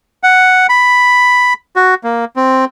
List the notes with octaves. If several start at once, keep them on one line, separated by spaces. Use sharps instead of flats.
F#5
B5
F#4
A#3
C4